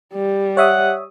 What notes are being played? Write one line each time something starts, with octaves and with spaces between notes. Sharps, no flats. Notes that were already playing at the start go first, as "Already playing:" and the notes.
G3
C#5 E5 F#5 D#6